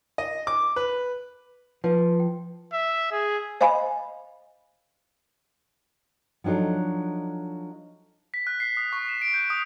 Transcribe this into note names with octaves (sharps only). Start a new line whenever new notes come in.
D#5
D6
B4
F3 B4
G5
E5
G#4
C5 D#5 F5 G#5 B5
F3 F#3 D4 D#4 A4
B6
F#6
C7
D#6
C#6
E7
D7
G6
D#6